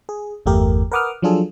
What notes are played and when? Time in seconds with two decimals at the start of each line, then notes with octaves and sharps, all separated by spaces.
0.09 G#4
0.46 G1 E2 A3 G4 A#4
0.92 A#4 B4 F#5 D6 D#6 F6
1.22 F3 F#3 D4 F4 G#4 A4